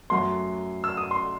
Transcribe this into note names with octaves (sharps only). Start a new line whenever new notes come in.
F#2 F#3 A3 C6
E6
D#6
C6